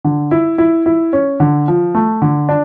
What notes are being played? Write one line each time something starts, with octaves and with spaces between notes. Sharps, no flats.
D3
E4
E4
E4
C#4
D3
F3
A3
D3
D4